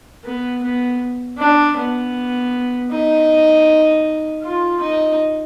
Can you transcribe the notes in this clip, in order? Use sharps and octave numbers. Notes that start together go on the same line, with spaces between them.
B3
B3
D4
B3
D#4
F4
D#4